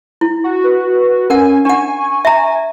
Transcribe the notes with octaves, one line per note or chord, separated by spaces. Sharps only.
E4
F#4
B4
C#4 A#4 F#5 G#5
D4 F#5 G#5 C#6
E5 A#5